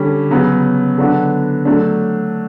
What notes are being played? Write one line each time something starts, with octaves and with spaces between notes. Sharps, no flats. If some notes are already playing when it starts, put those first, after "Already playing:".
Already playing: D3 G3 C#4
C#3 F#3 B3
D3 F#3 B3 D4 F#4
F#3 A3 D4